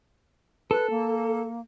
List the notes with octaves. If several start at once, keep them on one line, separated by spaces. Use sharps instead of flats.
A4 B4
A#3